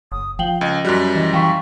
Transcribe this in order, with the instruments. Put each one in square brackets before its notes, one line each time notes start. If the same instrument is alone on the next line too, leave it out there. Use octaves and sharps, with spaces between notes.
[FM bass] F#1 [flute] D#6
[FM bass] F3 [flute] F5 [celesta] G5 F#7 G7
[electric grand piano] C#2 [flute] D#5
[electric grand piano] F#2 G3 [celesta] F#4 F#6
[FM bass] E3 [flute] D#5
[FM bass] E3 [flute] F5 [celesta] G5 C#6 B6